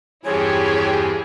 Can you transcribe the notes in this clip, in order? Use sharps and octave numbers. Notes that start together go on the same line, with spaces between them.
E2 G2 C4 E4 G4 G#4 C#5 G#5